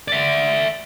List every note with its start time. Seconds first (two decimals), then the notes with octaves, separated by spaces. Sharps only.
0.08 D5 E5